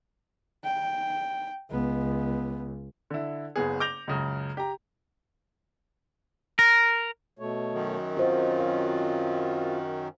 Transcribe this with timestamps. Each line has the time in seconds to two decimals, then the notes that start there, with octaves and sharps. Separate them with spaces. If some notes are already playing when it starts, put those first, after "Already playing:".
0.64 G5
1.71 C#2 B3
3.10 D3 E4
3.56 F#1 C#3 B3 G#4
3.80 D6 G6 A#6 F7
4.08 C#2 F#2 C#3
4.57 G4 A#5
6.59 A#4
7.39 B2 A3 C#5
7.73 F#2 D#3
8.17 C4 F4 F#4 C5 D#5
8.60 F5